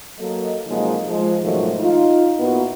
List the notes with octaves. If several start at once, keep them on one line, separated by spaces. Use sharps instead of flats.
F#3 A#3 A4 D#5
C3 F3 F#3 G#3 A#3 D#4
F3 G#3
G#2 B2 D#3 F3 F#3 A3
D#4 F4
A#2 A#3 B3 D#4 E4 F#4